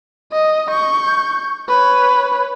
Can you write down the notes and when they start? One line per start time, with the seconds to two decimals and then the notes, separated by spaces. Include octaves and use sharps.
0.32 D#5
0.70 C#6 G6
1.68 B4 C#5